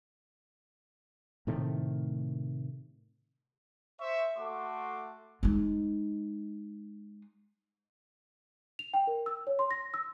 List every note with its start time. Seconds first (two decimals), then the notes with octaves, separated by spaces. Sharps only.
1.47 A2 C3 D#3 A3
4.00 C5 E5 C#6
4.37 A3 F#4 A4 E5 C6 D6
5.43 G#3 D#4
8.79 F7
8.94 G5
9.07 A#4
9.26 E6
9.47 C#5
9.59 C6
9.71 A#6
9.94 E6